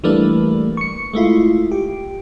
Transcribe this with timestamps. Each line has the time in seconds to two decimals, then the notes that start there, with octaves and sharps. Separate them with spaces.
0.04 E3 G3 A3 A#3 D4 B4
0.77 C#6 C#7
1.13 G#3 A3 E4 F4
1.72 G4